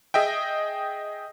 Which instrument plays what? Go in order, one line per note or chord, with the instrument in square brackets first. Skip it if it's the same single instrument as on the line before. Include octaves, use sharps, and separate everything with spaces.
[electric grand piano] G#4 D#5 E5 G5